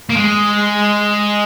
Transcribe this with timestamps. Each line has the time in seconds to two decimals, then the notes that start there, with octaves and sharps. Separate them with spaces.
0.10 A#3
0.16 G#3